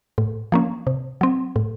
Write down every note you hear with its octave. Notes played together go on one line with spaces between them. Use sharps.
A2
F3 A#3 C#4
C3
F#3 C4
A2